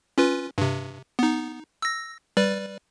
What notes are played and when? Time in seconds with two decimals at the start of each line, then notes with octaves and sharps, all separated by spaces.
0.18 C#4 F4 B4
0.58 G2 C3
1.19 B3 D#4
1.82 E6 A#6
2.37 G3 B4 D5